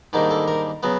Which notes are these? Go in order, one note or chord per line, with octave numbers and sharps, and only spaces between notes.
G#2 D#3 G3 A#3 D4
A4
A#4
C#3 F#3 B3